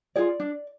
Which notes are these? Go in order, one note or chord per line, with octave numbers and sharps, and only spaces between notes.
F4 G#4 D5
D4